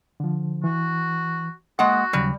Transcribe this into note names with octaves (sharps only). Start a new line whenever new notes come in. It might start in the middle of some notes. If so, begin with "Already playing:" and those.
D3 F3
E3 F#4
G#3 A#3 F#4 F#5 D#6
D#2 C#3 F#3 G3